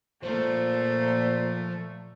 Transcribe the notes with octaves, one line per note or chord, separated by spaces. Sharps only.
A#2 F3 A3 C5